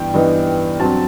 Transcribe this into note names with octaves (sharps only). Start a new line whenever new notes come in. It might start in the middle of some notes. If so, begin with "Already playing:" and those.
Already playing: G2 E3 B3 G5
G2 E3 B3 D#4
G2 F#3 C4 A5